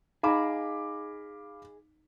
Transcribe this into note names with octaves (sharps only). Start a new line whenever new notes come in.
D#4 G#4 D#5 F5 A#5 B5 D6